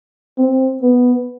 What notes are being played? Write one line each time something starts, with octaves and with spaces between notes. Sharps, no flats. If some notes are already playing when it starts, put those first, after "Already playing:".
C4
B3